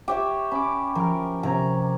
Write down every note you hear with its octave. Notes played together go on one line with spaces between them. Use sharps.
G4 C#5 E5
C#4 B5 D6
F3 A#4 D6 F6
C3 C#4 A#5